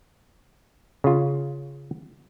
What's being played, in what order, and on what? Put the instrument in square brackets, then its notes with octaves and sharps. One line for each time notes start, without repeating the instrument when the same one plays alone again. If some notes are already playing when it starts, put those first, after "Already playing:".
[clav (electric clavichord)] C#3 F4